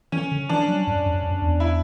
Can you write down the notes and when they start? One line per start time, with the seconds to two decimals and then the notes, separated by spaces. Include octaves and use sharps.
0.12 E3 C#4
0.31 D3
0.49 E3 D4
0.68 F#3
0.87 G2
1.06 F#2
1.23 F#2
1.42 E2
1.60 E4